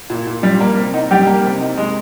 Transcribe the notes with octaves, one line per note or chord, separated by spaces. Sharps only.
A#2
A#2
G3
A#3
C3
D#4
G3 G4
A#3
C3
D#4
G#3